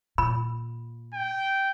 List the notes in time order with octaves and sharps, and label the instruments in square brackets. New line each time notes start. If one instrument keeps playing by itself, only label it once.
[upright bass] A#2 [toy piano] B5
[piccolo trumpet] G5